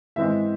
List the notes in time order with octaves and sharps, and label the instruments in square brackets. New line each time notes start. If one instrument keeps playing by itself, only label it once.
[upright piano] G#2 E3 G#3 C4 E5